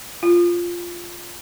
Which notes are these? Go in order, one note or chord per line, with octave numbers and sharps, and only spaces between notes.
F4